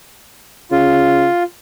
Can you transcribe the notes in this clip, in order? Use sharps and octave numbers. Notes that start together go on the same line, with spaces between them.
C#3 F4